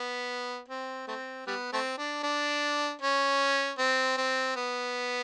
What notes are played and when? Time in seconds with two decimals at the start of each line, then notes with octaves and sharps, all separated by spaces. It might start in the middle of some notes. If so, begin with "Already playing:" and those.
Already playing: B3
0.69 C4
1.07 A3 C4
1.47 G3 B3
1.73 A3 C4
1.98 D4
2.23 D4
3.02 C#4
3.78 C4
4.17 C4
4.56 B3